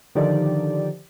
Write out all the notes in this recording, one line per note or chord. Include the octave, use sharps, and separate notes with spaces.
D3 D#3 F3 D#4 G4 D5